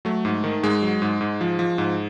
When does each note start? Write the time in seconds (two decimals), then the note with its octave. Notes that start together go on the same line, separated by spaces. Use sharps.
0.05 F#3 A3
0.25 G#2
0.44 D#3
0.63 G#2 G#3
0.82 F#3
1.02 G#2
1.21 G#2
1.41 F3
1.59 F3
1.78 G#2